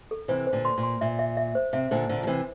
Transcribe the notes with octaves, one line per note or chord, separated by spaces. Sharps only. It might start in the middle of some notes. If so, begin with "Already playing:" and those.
A4
C3 E3 C5
C5
A#2 D3
C6
A#2
C6
A#2 E5
E5
E5
C5
C3 E5
A#2 D3 C5
A#2 D3 C5
F3
C3 E3 C5